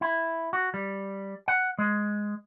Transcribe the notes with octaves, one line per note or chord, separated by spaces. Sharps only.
E4
F#4
G3
F#5
G#3